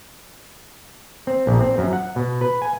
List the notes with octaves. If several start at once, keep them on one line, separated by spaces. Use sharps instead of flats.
C4
A#1
C4
F#2
F#5
B2
B4
G#5